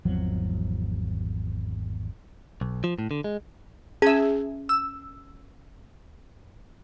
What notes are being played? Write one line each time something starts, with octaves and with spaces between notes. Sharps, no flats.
G#1 E2 F3 F#3
B1
F3
A2
D3
G#3
C#4 G#4 E5
E6